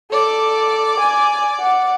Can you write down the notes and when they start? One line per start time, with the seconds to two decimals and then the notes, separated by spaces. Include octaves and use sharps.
0.12 A4 D5 D6
1.00 G#5
1.60 F#5